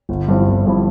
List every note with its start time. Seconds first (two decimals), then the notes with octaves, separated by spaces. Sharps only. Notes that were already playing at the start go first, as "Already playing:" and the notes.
0.09 G1
0.28 G2 F3 C4 E4
0.46 G1
0.66 G2 F3 C4 E4